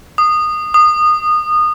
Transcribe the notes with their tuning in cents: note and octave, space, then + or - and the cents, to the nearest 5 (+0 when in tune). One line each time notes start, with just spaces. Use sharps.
D#6 -20
D#6 -25